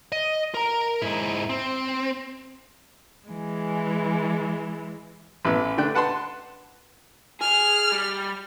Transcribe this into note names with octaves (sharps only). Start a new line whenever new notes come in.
D#5
A#4 A#5
G#2 E4
C4
E3 G#3
A1 E3 B3 E6
D3 A3 D4 G5 F#6
B4 F#5 A5 B5 C6
G#4 F6
G3